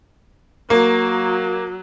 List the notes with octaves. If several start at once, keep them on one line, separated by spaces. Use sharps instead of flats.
F#3 A#3